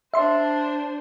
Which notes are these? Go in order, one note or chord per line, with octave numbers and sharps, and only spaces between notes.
D4 C5 E5 C6